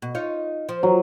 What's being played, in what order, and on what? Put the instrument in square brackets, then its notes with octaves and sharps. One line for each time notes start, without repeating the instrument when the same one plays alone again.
[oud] B2
D#4 F4 C#5
F3
[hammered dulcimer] F#3